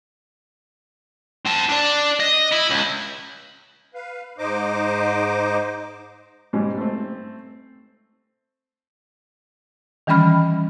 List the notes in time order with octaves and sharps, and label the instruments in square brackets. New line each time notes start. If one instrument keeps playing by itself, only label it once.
[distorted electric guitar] C4 A5
D4 D5
D#5
E4
C#2
[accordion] B4 F5
G#2 D#4 C5 D#5 D6
[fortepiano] G#2 B2 G3 C#4
A3 C4
[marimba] D#3 E3 G3 C#4 B5 F6